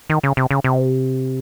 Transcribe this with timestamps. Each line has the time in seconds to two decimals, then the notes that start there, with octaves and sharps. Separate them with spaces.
0.10 D#3
0.23 C#3
0.37 C3
0.51 C#3
0.64 C3